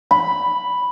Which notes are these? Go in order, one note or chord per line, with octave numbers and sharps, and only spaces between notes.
B5